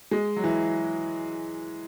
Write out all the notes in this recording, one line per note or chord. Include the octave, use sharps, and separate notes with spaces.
G#3
F#3
E3